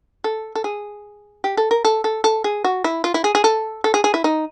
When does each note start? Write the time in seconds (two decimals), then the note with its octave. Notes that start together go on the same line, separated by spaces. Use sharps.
0.24 A4
0.55 A4
0.64 G#4
1.44 G4
1.57 A4
1.71 A#4
1.85 A4
2.04 A4
2.24 A4
2.44 G#4
2.64 F#4
2.84 E4
3.04 F4
3.14 E4
3.24 G#4
3.35 G#4
3.44 A4
3.84 A4
3.94 G#4
4.04 G#4
4.14 E4
4.24 D#4